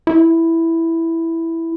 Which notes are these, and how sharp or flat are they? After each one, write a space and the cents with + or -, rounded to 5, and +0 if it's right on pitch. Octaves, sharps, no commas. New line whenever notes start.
E4 +0